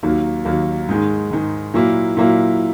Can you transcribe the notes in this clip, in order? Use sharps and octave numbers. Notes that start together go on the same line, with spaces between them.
D#2 D#3 F#3 A#3
D#2 D#3 F#3 A#3
G#2 D#3 G#3
G#2 D#3 G#3
A#2 F#3 A#3 E4
A#2 F#3 A#3 E4